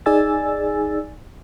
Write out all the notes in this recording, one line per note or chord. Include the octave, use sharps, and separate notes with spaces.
D#4 G#4 D5 G#5 E6 A6